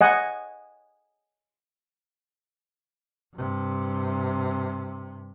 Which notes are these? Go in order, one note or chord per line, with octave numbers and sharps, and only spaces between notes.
D#5 F#5 G#5
G2 C3